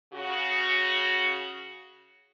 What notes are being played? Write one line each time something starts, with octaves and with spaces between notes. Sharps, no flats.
C#3 F#4